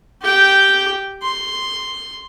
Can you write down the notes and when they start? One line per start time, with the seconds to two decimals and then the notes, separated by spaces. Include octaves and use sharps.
0.22 G4 G5
1.22 C6